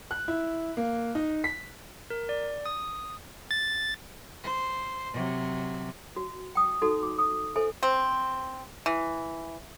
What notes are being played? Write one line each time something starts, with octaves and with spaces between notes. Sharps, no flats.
F#6
E4
A#3
D#4
B6
A#4
D5
D#6
A6
C5
C3 F#3
F#4
G5 D#6
D#4 F#4 A4
D6
D#6
A4 C5 E5 G#5
C4
E3